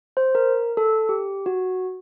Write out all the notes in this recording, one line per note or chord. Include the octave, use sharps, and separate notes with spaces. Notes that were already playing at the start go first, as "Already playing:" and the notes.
C5
A#4
A4
G4
F#4